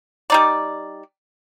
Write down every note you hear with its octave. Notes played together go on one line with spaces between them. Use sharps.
G3 D#4 D5